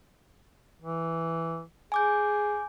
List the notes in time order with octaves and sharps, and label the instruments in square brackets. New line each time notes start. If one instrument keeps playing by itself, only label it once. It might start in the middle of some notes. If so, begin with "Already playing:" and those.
[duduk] E3
[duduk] G#4 [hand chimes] G#5 D6 G6